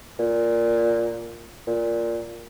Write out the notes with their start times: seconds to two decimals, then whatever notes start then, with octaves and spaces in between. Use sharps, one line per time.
0.19 A#2
1.67 A#2